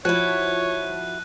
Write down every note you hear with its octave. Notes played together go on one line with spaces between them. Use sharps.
F3 E4 F#4 C#5 F#6 D#7